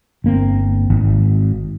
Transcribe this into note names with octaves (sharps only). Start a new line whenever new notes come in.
G1 A#3 C4
G#1